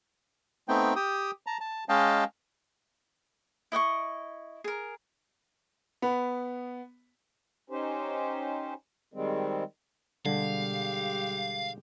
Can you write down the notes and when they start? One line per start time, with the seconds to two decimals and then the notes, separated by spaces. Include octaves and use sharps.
0.68 A3 B3 C4 D#4 G5
0.96 G4 G5 D#6
1.47 A5 A#5
1.61 A5
1.89 G#3 C#4 D#5 F5 G5 A5
3.72 E4 D#5 F#5 C#6
4.64 G#4 A#4
6.02 B3 B5
7.70 C#4 D#4 G4 C5
9.14 D#3 G3 G#3 C4
10.26 B2 D3 G3 G#3 G4 F5